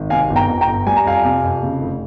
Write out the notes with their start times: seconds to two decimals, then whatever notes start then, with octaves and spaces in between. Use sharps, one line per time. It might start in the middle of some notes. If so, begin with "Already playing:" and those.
Already playing: G#1
0.10 C3 F5 G#5
0.30 G1
0.36 G5 A#5
0.48 F2
0.61 G5 A#5
0.67 G1
0.87 G3 G#5
0.96 A#5
1.05 F2 F5 G#5
1.25 C3
1.44 F2
1.63 C#3
1.81 F1